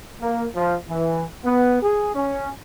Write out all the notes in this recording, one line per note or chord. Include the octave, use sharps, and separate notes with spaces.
A#3
F3
E3
B3
G#4
C#4